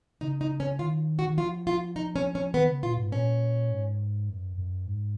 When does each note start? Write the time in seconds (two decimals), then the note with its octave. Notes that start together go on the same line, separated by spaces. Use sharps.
0.21 C#3 D#4
0.41 D#4
0.60 C#4
0.79 D#3 F4
1.19 F#4
1.27 D#3
1.38 F3 F4
1.67 F4
1.96 D#4
2.16 C#4
2.35 C#4
2.54 D#3 B3
2.69 C#3
2.83 A#2 F4
2.98 G#2
3.12 A#2 C#4
3.71 G#2
4.29 F#2
4.58 F#2
4.86 G#2